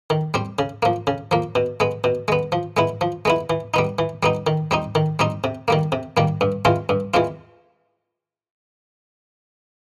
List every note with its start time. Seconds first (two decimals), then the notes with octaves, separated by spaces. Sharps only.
0.10 D#3
0.34 G3 C4
0.59 C#3
0.83 F3 A#3
1.07 C#3
1.31 F3 A#3
1.55 B2
1.80 G#3 B3
2.04 B2
2.28 G#3 B3
2.52 F3
2.77 G#3 B3 E4
3.01 F3
3.25 G#3 B3 E4
3.50 E3
3.74 G3 B3 D#4
3.99 E3
4.23 G3 B3 D#4
4.47 D#3
4.71 G3 C4 D#4
4.95 D#3
5.19 G3 C4 D#4
5.44 C3
5.68 D#3 G3 A#3
5.92 C3
6.17 D#3 G3 A#3
6.41 G2
6.65 E3 G#3 C4 F4
6.89 G2
7.14 E3 G#3 C4 F4